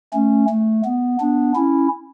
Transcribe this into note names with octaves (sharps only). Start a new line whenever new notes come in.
A3 C#4
A3
B3
B3 D4
C#4 E4